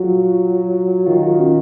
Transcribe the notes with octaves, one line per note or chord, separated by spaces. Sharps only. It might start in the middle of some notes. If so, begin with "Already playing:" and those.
Already playing: F#3 F4 F#4
D#3 F4
F#4
C#4